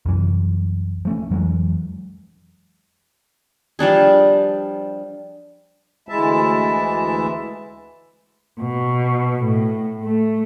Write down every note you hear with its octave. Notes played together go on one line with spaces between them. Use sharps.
C2 F#2 E3
F3 A3 C#4
F2 E3 F#3 G#3
F3 G3 D4 G#4
D2 E3 G#3 E4 E5 A5
B2
A2
A3